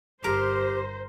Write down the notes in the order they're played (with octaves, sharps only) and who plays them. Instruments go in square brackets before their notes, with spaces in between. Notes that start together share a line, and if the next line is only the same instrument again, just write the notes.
[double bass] G1 [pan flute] G4 [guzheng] A#4 [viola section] C5